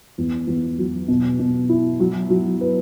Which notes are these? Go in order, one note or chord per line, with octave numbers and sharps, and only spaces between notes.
E2
E2
F#3
B2
B2
E4
F#3
F#3
B4